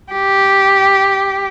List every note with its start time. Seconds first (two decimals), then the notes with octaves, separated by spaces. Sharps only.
0.12 G4